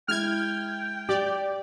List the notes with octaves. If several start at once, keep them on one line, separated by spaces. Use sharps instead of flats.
G#3 E4 G5 F6 G#6
G4 D5